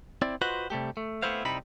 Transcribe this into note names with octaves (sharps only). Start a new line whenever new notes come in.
C4 E4 D5
F4 F#4 B4 C5 D#5 F#5
C3 G3 A3 G4
A3
A3 B3 C4 E4 C5 F5
C2 C3 G3 D#4 E4 B5